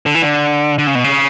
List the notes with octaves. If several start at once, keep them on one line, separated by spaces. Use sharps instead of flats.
D3
E3
D3
D3
C#3
B2
C#3